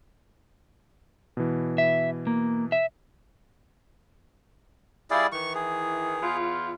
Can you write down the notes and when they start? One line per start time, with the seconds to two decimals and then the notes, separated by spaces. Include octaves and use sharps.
1.37 B2 E3
1.78 E5
2.27 A#3
2.72 E5
5.11 G3 E4 G#4 D5 F5
5.32 D#3 E3 C#6
5.55 G#4
6.22 E2 F4